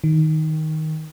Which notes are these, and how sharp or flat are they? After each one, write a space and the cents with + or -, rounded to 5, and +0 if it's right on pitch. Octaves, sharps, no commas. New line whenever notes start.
D#3 +10